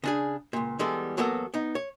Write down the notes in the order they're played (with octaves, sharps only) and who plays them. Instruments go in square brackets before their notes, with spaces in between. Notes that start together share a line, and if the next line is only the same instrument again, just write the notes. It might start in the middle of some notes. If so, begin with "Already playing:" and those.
[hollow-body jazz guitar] C#3 D4 G#4
C#2 A#2
E3 G3 G#3 B3 A4
E2 F#3 A#3 B3 F#4 A4
B3 D#4
C#5